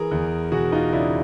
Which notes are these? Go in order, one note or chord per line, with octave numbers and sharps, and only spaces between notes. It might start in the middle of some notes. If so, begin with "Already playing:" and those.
Already playing: E3 G#4 A#4
E2
E1 F#4 G#4
D#4 F4
C#3 D4 E4